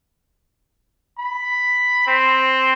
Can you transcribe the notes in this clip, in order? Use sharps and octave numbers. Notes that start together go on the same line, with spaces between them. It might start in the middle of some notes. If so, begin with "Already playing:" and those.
B5
C4